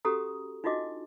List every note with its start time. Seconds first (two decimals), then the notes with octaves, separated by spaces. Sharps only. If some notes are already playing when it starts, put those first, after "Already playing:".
0.05 C#4 F#4 G4 A4 A#5 D#6
0.64 D4 D#4 F4 F#4 D#5 D6